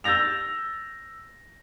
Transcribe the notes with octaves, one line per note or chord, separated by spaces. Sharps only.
E6 G6 A6 A#6 F7